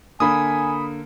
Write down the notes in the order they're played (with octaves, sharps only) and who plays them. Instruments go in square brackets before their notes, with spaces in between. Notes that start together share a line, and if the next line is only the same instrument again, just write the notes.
[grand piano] D3 A#3 [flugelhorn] G#5 [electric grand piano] B5 D#6